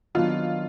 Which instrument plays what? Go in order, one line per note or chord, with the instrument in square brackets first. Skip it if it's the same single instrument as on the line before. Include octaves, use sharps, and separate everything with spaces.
[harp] D#3 F#3 B3 D4 [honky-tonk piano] F4